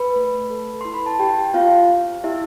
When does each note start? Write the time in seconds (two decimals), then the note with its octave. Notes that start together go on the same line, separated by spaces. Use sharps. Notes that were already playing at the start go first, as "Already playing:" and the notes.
Already playing: B4 B5
0.16 A3
0.50 A4
0.81 E4 C6
0.94 B5
1.06 A5
1.19 G4 G5
1.54 C4 F4 F5
1.89 C4
2.24 E4 G4 E5